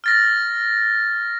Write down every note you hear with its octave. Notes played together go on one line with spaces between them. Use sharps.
F6 A6 A#6